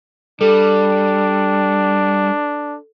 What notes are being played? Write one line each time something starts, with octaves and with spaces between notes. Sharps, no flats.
G3 D4 A4